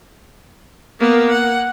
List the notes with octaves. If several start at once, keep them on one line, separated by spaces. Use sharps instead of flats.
A#3 B3
F#5